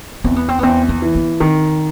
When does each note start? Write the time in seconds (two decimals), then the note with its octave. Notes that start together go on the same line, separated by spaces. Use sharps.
0.24 E2 C4
0.36 B3
0.49 C4
0.59 B3
0.63 E2 C4
0.89 B3
1.02 E3
1.15 B3
1.40 D#3 C4